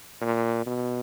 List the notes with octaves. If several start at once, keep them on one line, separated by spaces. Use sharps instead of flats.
A#2
B2